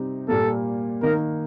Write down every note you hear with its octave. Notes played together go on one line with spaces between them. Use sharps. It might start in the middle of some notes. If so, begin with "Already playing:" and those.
Already playing: C3 G3 C4 D#4
A#2 G3 A#3 A4
D#3 A#3 D#4 A#4